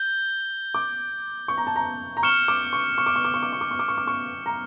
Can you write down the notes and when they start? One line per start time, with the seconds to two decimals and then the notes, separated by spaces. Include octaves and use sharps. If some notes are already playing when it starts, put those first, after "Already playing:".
Already playing: G6 G7
0.74 D6
1.48 C#6
1.58 A#5
1.67 A5
1.76 A#5
2.17 A#5
2.23 C#6 F6 C#7 E7 G7
2.48 D6
2.73 C#6
2.98 C#6
3.06 D6
3.16 C#6
3.25 D6
3.34 C#6
3.43 D6
3.53 C#6
3.61 D6
3.71 C#6
3.79 D6
3.88 C#6
3.98 D6
4.07 C#6
4.46 A#5